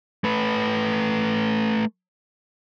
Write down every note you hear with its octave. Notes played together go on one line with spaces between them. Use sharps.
A3 B4